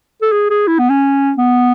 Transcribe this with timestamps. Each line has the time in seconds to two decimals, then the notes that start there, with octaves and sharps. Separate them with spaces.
0.22 A4
0.32 G#4
0.50 G#4
0.67 E4
0.79 B3
0.90 C#4
1.38 B3